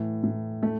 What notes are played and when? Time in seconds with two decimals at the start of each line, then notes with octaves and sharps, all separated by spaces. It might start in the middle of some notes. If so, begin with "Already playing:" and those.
Already playing: A2 E3
0.23 A2
0.63 A3